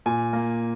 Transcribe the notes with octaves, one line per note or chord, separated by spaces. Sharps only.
A#2 G#5
A#3